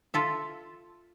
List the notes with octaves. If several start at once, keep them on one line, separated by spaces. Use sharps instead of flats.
F4 A4 E5